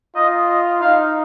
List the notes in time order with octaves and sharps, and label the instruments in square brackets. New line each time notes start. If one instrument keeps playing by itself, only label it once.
[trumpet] F4 [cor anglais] D#5
[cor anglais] D#5
[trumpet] D#4 [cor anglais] F5